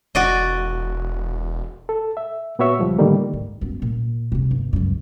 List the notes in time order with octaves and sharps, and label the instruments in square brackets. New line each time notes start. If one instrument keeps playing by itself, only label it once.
[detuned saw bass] E1 [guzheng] F#4 D5 D#5
[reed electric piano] A4
E5
A#2 B3 F#4 C#5 E5 C#6
C#2 F3 G3
A2 D3 D#3 G3 A3 A#3
[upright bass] G#2
F#2 B3
A#2
F1 C3
G1
C#2 F#2